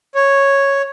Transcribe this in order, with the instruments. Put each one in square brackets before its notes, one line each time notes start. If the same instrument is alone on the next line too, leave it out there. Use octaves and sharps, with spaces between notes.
[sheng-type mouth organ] C#5